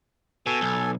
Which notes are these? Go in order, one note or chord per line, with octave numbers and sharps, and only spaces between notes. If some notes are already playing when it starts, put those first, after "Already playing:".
B2 A4 G#5
B1